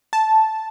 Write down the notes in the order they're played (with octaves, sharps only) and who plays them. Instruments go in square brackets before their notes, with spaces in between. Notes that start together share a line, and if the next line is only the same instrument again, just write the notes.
[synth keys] A5